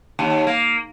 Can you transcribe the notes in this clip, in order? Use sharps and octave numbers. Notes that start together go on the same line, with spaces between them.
D#2
A#3